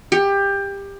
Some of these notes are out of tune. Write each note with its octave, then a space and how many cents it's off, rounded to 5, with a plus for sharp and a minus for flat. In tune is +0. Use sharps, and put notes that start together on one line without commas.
G4 +20